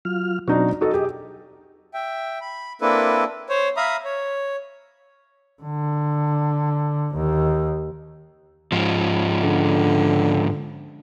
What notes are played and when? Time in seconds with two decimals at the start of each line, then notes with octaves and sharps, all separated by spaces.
0.05 F#3 F4 F6
0.48 B2 F#3 C4 D4 D#4 F#4
0.81 D#4 F#4 A4 D#5
0.93 G4 G#4
1.94 E5 G5
2.41 B5
2.81 A#3 C4 D4 E4 A4 B4
3.49 C5 C#5
3.77 E5 F5 A#5 B5 D#6
4.05 C#5
5.62 D3
7.14 D#2
8.72 G#2 F3
9.42 D3